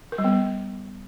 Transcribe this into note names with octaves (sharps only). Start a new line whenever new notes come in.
A#4
G3
B3